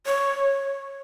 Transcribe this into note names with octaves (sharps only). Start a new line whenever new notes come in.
C#5